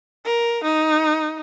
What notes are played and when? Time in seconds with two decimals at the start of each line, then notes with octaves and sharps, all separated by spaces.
0.25 A#4
0.64 D#4